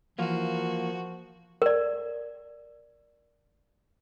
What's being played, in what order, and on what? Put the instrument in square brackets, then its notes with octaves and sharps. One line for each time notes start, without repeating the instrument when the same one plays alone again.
[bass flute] E3 [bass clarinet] F3 [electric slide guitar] A#3 F4 [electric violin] F#4
[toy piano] A#4 D5